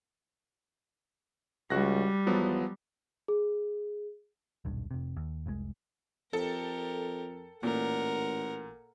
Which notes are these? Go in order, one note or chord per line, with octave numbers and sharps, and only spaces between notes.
C#2 G3 F#4 F#6 A#6
E2 F3 F#3 B3
G#4
D#1 B1 G2
F1 C3
D#2
F1 C2 B2 G#3
F2 G4 A4 A#4
A1 A#2 A#4 F#5